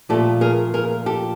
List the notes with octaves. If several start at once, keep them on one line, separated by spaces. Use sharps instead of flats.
A#2 F3 A3 G4 A4
G#4 A#4
G#4 A#4
G4 A4